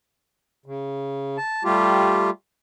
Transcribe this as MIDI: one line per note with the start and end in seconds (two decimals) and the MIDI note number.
0.66 1.37 49
1.38 1.63 81
1.65 2.30 55
1.65 2.30 57
1.65 2.30 65
1.65 2.30 67